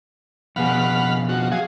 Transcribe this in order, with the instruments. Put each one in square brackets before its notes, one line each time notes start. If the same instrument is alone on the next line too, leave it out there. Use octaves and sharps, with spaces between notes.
[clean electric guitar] F2 B2 G#4 [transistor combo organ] F5 F#5 B5
[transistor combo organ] F3 F#4
[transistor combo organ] F#3 G#4 [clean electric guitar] F5